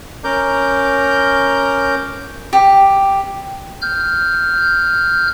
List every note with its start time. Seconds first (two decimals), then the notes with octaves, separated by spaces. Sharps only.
0.24 C#4 A#4 A#5 D6 G6
2.53 G4
3.82 F6 G6